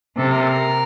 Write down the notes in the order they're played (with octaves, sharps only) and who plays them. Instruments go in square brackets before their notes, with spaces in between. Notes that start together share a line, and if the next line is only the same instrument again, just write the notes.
[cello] C3 [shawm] A4
[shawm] A#4
A4
A#4